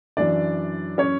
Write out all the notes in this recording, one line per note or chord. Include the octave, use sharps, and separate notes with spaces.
F#2 E3 D4 D5
C#4 C#5